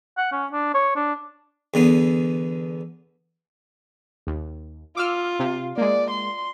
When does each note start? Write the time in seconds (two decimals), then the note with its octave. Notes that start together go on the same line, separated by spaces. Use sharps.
0.18 F#5
0.32 C#4
0.52 D4
0.74 C#5
0.96 D4
1.74 E2 D3 B3
4.27 D#2
4.97 F4 D6 E6 F6
5.39 C3
5.78 G#3 A#3 D5
6.11 C6